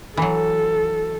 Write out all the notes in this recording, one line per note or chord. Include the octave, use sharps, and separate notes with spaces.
E3 F#3 A4